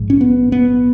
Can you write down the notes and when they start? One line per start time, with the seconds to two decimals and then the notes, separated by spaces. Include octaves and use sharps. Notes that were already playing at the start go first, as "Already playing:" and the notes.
Already playing: A#1 G#2
0.10 C#4
0.21 B3
0.52 B3